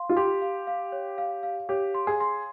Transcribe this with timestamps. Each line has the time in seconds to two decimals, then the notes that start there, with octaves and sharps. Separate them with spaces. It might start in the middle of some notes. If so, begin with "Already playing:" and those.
Already playing: F5 C6
0.09 F4
0.17 G4 C6
0.42 F5
0.67 F5
0.92 C#5
1.18 F5
1.43 F5
1.69 G4 C#5
1.94 C6
2.07 G#4
2.20 C6